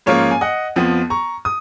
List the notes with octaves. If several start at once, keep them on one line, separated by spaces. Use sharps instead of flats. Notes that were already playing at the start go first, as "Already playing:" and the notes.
G#2 F3 A#3 C#4 C#5 F5
G#5
D#5 F#5
F2 F3 B3
A#5 C#6
D#6